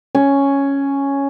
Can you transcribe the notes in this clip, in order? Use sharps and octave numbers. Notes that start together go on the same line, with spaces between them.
C#4